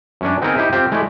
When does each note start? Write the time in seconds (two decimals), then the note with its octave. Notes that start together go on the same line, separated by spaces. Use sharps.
0.21 F#2 C#4 D4
0.41 B3 C4 D#4 G#4 A#4
0.55 D#4 E4 G4 C5 D#5 E5
0.72 C4 F4 G4 C5
0.92 G#3 A3 E4 D5